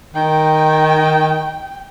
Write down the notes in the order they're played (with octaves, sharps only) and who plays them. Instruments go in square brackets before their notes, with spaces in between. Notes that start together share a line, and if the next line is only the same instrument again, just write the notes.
[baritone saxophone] D#3 [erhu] G5